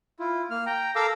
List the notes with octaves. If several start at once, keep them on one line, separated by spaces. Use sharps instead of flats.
E4 F4
A#3 F6
G5 A#5
A4 A#4 F5 A#5 D6 E6